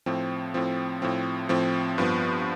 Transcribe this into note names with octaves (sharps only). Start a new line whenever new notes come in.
A2 F3 C4
A2 F3 C4
A2 F3 C4
A2 F3 C4
G2 F3 B3